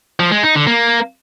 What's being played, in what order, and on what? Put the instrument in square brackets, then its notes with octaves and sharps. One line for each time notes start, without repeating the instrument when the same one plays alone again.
[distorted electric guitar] F3
G#3
D#4
D3
A#3